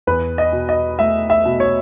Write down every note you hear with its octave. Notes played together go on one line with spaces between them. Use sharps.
E2 B4
D#5
B2
D#5
A3 E5
E5
B2
C#5